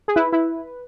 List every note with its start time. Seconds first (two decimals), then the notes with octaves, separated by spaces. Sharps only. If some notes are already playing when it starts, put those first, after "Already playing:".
0.08 G#4
0.16 E4 B4
0.33 E4